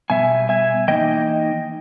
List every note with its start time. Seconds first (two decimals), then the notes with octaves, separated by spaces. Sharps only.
0.10 B2 G3 B3 E5 G#5
0.49 E5 G#5
0.88 E3 A#3 D#4 D#5 G5